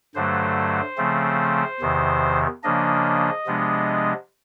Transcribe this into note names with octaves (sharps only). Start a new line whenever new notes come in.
G2 D3 F#3 A3 C5
C#3 F3 A3 C4
E2 C3 D#3
C#3 F3 A#3 D4 D#5
C3 F3 G#3 B3 D4